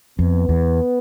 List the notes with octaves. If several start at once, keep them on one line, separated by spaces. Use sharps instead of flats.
F2 B3
E2